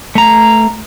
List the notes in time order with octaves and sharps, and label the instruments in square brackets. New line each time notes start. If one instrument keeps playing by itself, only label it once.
[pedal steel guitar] A3 A#5